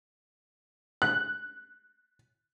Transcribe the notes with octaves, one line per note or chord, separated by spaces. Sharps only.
F#6